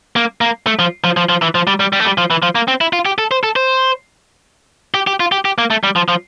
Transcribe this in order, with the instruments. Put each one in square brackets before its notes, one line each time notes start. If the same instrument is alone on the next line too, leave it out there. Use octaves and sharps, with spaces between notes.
[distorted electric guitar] A#3
A#3
A3
F3
F3
F3
F3
E3
F3
G3
G3
G3
A3
G3
F3
E3
F3
A#3
C4
E4
F4
G4
A4
C5
A4
C5
G4
G4
F4
G4
G4
A#3
A3
G3
F3
F3